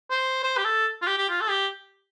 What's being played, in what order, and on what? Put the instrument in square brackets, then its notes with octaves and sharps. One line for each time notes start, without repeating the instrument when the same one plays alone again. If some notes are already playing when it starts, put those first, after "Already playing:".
[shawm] C5
C5
G4
A4
F4
G4
G4
F4
A4
G4